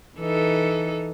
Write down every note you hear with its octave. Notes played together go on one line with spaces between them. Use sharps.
E3 D#4 A4